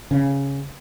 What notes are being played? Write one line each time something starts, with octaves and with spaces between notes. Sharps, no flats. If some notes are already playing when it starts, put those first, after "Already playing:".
C#3